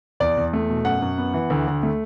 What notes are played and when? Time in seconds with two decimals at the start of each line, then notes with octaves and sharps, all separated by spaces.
0.20 E2 D5
0.37 E2
0.54 A3
0.69 B2
0.85 F#2 F#5
1.02 F#2
1.18 B3
1.34 E3
1.50 D2
1.67 D2
1.83 A3